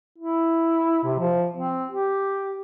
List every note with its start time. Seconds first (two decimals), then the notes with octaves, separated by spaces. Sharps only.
0.18 E4
1.04 C3
1.19 F3
1.57 C4
1.91 G4